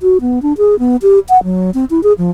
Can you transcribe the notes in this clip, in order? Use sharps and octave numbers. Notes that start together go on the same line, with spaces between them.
F#4
B3
D4
G#4
B3
G4
F#5
F#3
C4
E4
G#4
F3